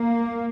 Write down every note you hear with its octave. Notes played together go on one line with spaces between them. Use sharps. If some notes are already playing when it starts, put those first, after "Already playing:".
Already playing: A#3